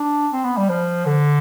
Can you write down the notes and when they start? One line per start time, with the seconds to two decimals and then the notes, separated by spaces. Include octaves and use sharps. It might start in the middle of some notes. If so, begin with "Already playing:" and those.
Already playing: D4
0.33 C4
0.44 B3
0.57 G3
0.69 F3
1.06 D3